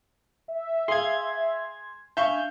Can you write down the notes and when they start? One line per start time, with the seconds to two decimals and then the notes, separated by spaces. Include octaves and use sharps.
0.48 E5
0.88 G#4 F5 C6 G#6
2.17 D4 E5 F5 G#5 C#6 G6